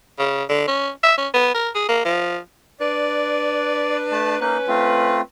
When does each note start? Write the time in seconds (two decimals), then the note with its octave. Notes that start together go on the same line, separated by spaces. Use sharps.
0.18 C#3
0.49 D3
0.68 C#4
1.03 E5
1.17 C#4
1.34 B3
1.54 A#4
1.75 G#4
1.89 A#3
2.05 F3
2.80 D4 B4 D5
4.12 A3 A5
4.41 A#3 C#4 D#4 B4
4.68 A3 C4 F4